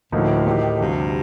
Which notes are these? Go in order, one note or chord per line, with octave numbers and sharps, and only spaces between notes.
D2 A2 D3 F3 A#3 D#4
D#3 A#3 D#4 G4
D2 G2 C3 F3